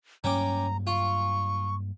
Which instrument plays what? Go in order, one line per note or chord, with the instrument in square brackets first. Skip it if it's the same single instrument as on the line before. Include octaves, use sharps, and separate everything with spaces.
[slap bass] G2 F#3 A#3 [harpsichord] C#4 G5 D6 [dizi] A#5
[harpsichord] F4 [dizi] C#6